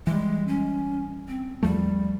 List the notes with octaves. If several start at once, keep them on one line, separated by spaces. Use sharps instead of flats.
E3 G3 G#3
C#4
C4
E2 F3 G3 A3